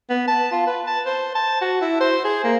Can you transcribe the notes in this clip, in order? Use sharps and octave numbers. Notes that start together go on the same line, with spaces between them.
B3
A5
F4
B4
A5
C5
A5
F#4
E4
C5
G#4
A#3